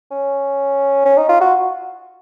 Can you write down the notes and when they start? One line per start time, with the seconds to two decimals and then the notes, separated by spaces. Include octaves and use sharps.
0.11 C#4
1.05 C#4
1.17 D#4
1.29 F4
1.41 F#4